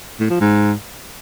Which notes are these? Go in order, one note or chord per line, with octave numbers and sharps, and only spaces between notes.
A2
F3
G#2